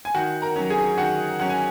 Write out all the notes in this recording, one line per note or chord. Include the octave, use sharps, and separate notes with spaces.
G#5
D#3 F#4 F#5
A#4 A#5
F#3 C#4
G#4 G#5
D#3 F#4 F#5
F#3 C#4 F#5
G#5